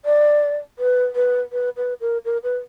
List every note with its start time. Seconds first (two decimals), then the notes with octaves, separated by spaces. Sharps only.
0.05 D5
0.79 B4
1.16 B4
1.52 B4
1.77 B4
2.01 A#4
2.25 A#4
2.43 B4